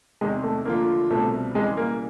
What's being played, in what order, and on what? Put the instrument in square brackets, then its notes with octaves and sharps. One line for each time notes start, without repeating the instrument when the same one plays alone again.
[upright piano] E2 C3 D#3 [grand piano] G#3
[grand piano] A3
[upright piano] D3 F3 A3 D4 F4 [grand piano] A#3
[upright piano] C2 B2 G3 C4 [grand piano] A3
[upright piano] C#3 E3 G3 [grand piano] G#3
[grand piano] A#3